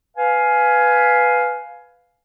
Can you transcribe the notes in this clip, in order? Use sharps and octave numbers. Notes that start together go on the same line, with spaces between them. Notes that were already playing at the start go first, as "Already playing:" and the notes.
B4 F5 G#5